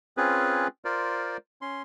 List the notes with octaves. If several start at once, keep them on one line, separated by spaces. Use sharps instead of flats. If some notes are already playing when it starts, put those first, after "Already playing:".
C4 C#4 F4 G#4 B4
F4 A#4 C5 D5
C#4 C6